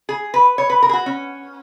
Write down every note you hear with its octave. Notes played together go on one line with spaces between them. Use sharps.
G#4
B4
C#5
B4
A#4
G#4
F#4
C#4